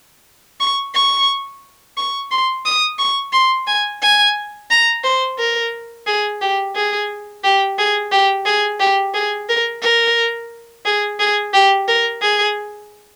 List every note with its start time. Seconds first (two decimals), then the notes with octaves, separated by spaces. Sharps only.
0.60 C#6
0.95 C#6
1.97 C#6
2.31 C6
2.66 D#6
2.99 C#6
3.33 C6
3.67 G#5
4.02 G#5
4.70 A#5
5.04 C5
5.39 A#4
6.07 G#4
6.41 G4
6.76 G#4
7.44 G4
7.79 G#4
8.12 G4
8.46 G#4
8.80 G4
9.14 G#4
9.49 A#4
9.83 A#4
10.85 G#4
11.19 G#4
11.54 G4
11.88 A#4
12.22 G#4